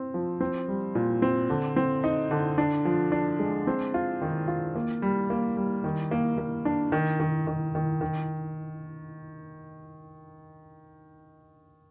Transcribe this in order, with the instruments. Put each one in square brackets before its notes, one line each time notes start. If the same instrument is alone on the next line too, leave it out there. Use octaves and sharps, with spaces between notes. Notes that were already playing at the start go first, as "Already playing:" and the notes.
Already playing: [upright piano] C4
F3
C4
G3
A#2
C4
D3
C4
D#4
D3
D4
F3
D4
G#3
C4
F4
D#3
F4
A#3
G3
A#3
G3
D#3
A#3
A#3
D4
D#3
D#3
D#3
D#3
D#3